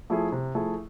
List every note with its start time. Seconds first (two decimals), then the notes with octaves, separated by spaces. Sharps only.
0.10 F3 A3 E4 G#4
0.32 C3
0.55 F3 A3 E4 G#4